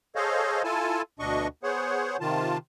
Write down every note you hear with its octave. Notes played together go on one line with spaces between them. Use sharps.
G#4 A4 C5 C#5 D#5 F5
E4 F4 A4 G#5 A5
D2 B2 D4 D#5 C#6
B3 G#4 C5 C#5 F#5
C3 D#3 F4 A5